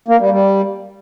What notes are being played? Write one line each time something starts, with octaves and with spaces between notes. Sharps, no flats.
A#3
G3
G3